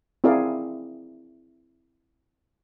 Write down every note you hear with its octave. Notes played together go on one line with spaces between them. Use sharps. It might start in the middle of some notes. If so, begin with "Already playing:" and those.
C4 E4 G#4 A#4 D5 F5